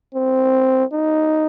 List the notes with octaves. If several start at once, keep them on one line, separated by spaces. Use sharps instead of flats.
C4
D#4